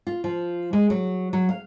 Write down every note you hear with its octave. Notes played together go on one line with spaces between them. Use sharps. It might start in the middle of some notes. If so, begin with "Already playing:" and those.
F4
F3
G#3
F#3
F#3
F5